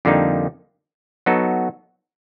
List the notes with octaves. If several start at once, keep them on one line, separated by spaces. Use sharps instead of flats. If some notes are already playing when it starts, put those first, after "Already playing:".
F2 D3 G3 A#3 D#4
F#3 B3 D#4 F#4 A4